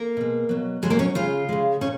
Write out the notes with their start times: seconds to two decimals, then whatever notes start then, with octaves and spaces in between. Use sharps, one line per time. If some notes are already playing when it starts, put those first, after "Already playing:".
Already playing: A#3 A#4
0.17 B2 G#3
0.49 B2 F#3
0.82 B2 F#3 G#3 G#4
0.90 A#3 A#4
0.99 C#4 C#5
1.15 C#3 G#3 F4 F5
1.49 C#3 G#3
1.81 A#2 C#4 C#5